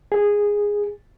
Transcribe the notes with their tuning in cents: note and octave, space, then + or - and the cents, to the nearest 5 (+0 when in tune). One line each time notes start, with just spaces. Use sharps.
G#4 -10